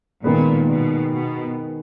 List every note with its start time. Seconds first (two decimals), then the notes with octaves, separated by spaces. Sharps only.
0.24 A#2 D#3 G#3 B3
0.68 B2
1.11 B2